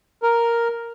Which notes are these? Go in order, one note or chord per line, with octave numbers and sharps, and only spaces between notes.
A#4